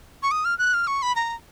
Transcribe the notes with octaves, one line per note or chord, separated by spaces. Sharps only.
C#6
D#6
F6
F#6
F6
C#6
B5
A#5